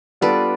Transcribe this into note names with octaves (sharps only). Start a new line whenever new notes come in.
G3 B3 D4 F4 A4 B4 D5